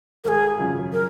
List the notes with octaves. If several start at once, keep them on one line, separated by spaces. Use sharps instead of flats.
G#1 G#4 A#4
F#2 C#3 F3
A#4